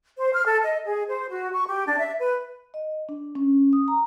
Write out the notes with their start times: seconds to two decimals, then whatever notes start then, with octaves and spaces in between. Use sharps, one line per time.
0.18 C5
0.32 F6
0.45 A4
0.63 D#5
0.86 G#4
1.08 C5
1.30 F#4
1.52 C#6
1.68 G4
1.86 D4
1.99 E5
2.19 B4
2.74 D#5
3.09 D4
3.35 C#4
3.73 D#6
3.88 A#5